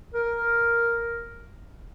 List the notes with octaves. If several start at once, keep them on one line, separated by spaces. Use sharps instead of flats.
A#4